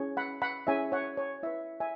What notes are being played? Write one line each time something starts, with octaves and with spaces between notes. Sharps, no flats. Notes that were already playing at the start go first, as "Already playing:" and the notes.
Already playing: C#4 E4 G#4 C#5
F#5 B5
F#5 B5
C#4 E4 G#4 C#5 E5 G#5
C#5 F#5
C#5
E4 B4 E5
E5 G#5